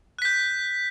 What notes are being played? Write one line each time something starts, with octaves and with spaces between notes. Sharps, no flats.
F#6 G6 B6